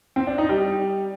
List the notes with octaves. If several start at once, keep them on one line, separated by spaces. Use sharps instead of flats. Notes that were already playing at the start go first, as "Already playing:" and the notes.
C4
D4
D#4
G3